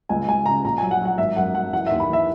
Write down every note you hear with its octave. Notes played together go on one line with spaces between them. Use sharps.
C#2 G#5
C#2 G#5
C#3 A#5
A#1 A#5
G#5
F#3
F#5
F#3 F#5
G#1 E5
F#2 F#5
F#2 F#5
E3 F#5
D#2 E5
B5
E3 E5